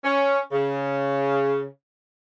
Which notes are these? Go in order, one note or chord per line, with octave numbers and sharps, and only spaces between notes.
C#4
C#3